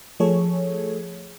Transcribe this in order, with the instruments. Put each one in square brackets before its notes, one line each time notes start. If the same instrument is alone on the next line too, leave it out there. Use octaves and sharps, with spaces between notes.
[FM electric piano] F3 A3 G#4 A4 C#5